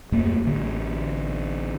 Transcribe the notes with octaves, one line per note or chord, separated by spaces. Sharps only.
D#1 F#2 A3 A#3
A1 D3